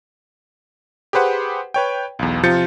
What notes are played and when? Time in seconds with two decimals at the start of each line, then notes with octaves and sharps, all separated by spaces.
1.13 G4 G#4 B4 C5 F#5
1.74 B4 C#5 G5
2.19 B1 E2
2.43 C3 F3 F4 G6 A6 C#7